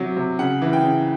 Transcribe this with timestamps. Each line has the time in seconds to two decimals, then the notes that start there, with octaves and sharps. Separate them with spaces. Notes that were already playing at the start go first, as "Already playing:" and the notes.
Already playing: C3 F#3
0.17 C3
0.39 C#3 F#5
0.62 E3
0.73 G5
0.84 C#3